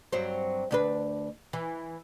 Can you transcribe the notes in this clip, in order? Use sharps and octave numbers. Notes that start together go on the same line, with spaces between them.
G2 F#3 C4
D2 D4 B4
E3